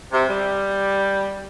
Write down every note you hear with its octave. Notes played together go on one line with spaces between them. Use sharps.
C3
G3